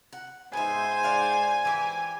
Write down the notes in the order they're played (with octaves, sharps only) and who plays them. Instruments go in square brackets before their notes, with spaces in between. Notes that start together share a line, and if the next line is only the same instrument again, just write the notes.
[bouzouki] F#5
[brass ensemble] G#2 C5 [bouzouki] B3 E5 [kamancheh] G#5
[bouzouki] D5 F5 F#5
E3 G4